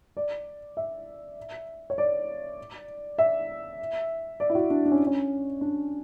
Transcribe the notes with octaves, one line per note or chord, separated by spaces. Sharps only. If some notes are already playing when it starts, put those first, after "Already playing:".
D5
E5
C#5
D5
E5
D5
E4
F#4
D4
D4
C#4
C#4
D4